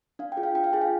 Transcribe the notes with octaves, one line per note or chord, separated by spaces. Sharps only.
D4 F5
G5
F4 G#4
F5
D4 G5
F5
F4 G#4 G#5
F5